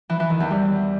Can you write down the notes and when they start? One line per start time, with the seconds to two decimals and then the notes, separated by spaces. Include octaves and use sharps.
0.10 E3
0.20 E3
0.30 D#3
0.40 E2
0.50 G3